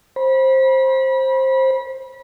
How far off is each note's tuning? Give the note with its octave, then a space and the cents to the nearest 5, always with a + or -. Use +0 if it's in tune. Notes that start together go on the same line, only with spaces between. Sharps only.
C5 +15 B5 -30